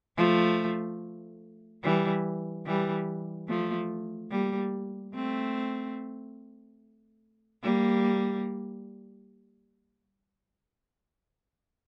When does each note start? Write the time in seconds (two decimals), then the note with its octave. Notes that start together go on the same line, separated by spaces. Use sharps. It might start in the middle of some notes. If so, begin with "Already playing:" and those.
0.17 F3 A3
1.84 E3 G3
2.66 E3 G3
3.48 F3 A3
4.31 G3 A#3
5.15 A3 C4
7.63 G3 A#3